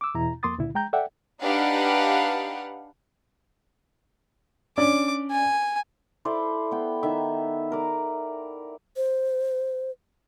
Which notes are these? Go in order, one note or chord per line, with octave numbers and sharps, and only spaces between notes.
D6 E6
E2 B2 E4 A#5
F2 A#3 C6 D6 D#6 A6
C#2 A#2 D3 E4
G#3 G5 A#5 G6
A4 D5 E5 F#5 G5
D4 D#4 G4 B4 F5 F#5
C#4 D4 D5 D6
G#5
E4 A4 C5 D5
B3 G5
D#3 E5
A#4 D5
C5